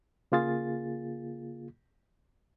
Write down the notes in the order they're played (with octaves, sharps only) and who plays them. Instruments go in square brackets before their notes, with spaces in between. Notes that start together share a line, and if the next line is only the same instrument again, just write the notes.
[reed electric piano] C#3 A#3 F4 G#4 A6